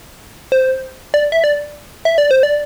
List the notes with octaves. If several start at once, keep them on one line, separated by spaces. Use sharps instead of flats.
C5
D5
E5
D5
E5
D5
C5
D5